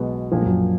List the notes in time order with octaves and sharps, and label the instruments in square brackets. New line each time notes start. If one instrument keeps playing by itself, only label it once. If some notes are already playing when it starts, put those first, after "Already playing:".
Already playing: [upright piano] B1 B2 G#3 B3
A#1 A#2 F3
[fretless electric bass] G#3
F#2 F#3